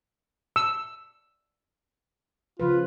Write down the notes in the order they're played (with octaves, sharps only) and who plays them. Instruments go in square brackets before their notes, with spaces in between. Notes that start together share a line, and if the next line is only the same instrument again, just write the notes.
[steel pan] E6
[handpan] C#3 F3 B4 [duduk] F4